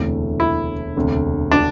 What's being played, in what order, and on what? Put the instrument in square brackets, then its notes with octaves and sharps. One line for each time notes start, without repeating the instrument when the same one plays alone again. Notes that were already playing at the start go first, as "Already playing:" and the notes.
Already playing: [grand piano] E1 D2 C3 E3 A3
[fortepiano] E4
[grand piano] E1 D2 C3
[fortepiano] D4